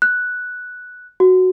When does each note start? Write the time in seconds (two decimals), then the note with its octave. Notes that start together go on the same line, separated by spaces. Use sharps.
0.02 F#6
1.20 F#4